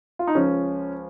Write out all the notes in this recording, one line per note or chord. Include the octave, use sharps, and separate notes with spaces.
F4
D#4
C#2 C#3 F3 C#4